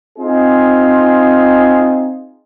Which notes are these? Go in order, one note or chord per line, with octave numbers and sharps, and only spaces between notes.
C4 D#4 F4 G#4